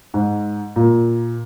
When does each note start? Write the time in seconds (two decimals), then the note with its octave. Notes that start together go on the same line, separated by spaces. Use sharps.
0.14 G#2
0.76 A#2